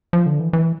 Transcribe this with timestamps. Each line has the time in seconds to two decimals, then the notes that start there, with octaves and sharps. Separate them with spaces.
0.13 F3
0.26 D3
0.40 E3
0.53 E3